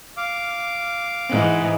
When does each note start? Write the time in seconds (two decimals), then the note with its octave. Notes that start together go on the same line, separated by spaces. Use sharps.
0.17 F5 D6
1.29 G#2 E3